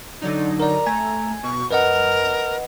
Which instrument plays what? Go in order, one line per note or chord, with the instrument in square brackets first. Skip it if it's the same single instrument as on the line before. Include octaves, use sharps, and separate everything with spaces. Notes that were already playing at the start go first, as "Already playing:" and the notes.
[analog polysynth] D3 F#3 D#4 [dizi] D5
[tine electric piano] A#4 D5 [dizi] A#5
[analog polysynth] A3 [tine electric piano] G#5 G#6
[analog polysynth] B2 [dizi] C#6
[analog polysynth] F#2 [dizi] A#4 [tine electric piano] B4 D#5 F#5